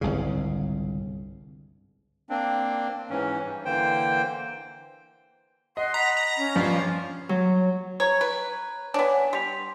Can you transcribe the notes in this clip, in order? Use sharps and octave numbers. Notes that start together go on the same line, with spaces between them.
G1 C2 G#2 C#3
A#3 C4 D4
G#2 E3 C#4
G2
D3 E3 A#3 C5 G5
D#5 F#5 C6
A#5 B5
A#5
C#4
G2 F3 F4
F#3
C#5 A#5
B4
B3 D4 C#5 G#5
G3 C6 B6 F7